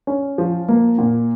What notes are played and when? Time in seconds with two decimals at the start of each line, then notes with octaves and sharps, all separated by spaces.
0.07 C#4
0.38 F3
0.68 A#3
0.98 A#2